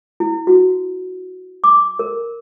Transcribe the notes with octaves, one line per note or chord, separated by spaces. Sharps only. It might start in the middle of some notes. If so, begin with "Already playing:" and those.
E4
F#4
D6
A#4